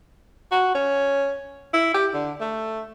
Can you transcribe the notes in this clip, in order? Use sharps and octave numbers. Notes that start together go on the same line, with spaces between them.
F#4
C#4
E4
G4
D3
A3